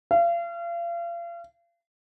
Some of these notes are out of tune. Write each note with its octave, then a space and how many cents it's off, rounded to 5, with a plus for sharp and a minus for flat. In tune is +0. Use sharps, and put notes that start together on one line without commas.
F5 -35